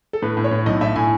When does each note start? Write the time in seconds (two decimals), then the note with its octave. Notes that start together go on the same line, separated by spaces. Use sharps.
0.13 A4
0.22 A2 B4
0.37 A2
0.44 C#5
0.51 A2
0.66 B1 D#5
0.81 A2 E5
0.96 A2 G#5